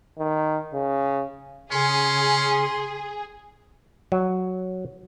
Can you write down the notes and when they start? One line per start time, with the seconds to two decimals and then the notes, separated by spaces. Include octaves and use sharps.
0.18 D#3
0.74 C#3
1.72 C#3 C#4 G#4 C6
4.12 F#3